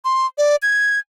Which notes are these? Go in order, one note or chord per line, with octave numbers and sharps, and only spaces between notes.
C6
D5
G#6